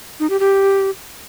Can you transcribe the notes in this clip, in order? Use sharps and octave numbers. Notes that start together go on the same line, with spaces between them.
D#4
G4
G4